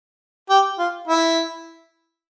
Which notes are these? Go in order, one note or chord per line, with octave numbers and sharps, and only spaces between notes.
G4
F4
E4